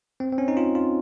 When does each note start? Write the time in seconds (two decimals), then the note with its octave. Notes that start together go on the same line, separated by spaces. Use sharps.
0.20 C4
0.33 C4
0.38 C#4
0.48 D#4
0.57 F4
0.75 F4